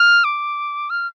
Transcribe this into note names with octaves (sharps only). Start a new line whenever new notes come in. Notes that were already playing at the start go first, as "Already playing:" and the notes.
Already playing: F6
D6
F6